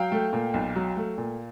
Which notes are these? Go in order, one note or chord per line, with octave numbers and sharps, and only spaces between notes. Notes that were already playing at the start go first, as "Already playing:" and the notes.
Already playing: F#3 F5 G5
A3
A#2
B1
F#3
A3
A#2